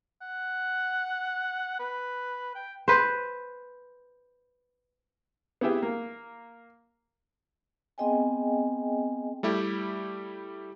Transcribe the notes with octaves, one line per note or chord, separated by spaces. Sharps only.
F#5
B4
G5
B4 C5
B3 E4 G4 G#4 E5 G5
A#3
B3 C4 G#4 D#5 G5 G#5
G3 A3 E4 G4